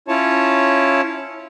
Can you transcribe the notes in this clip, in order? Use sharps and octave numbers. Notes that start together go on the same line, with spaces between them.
C#4 E4 F4 C#5 A5